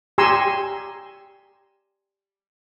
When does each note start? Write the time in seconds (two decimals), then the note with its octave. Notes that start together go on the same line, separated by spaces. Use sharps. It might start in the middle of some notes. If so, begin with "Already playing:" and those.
0.18 G4 G#5 A#5 C6 C#6 E6